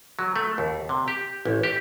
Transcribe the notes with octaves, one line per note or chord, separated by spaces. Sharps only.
F#3
A3
D#2
C3
G4
A1
G4